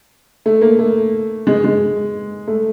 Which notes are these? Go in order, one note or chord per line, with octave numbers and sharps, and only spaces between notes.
A3
A#3
A3
G#3
G#3
A3